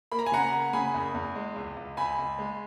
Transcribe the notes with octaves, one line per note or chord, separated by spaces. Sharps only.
A#3 B5
A#5
G#5
C#3 F#5 A#5
A#3
C#3 G#5 B5
E2
E2
G#3
C#2
C#2
C#2 G#5 B5
C#2
G#3